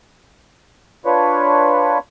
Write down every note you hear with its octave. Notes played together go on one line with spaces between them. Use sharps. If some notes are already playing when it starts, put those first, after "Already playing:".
D4 F4 B4 C#5